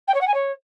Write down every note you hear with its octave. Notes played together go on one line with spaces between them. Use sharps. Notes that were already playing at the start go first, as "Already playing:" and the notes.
G5
C#5
F#5
G#5
C#5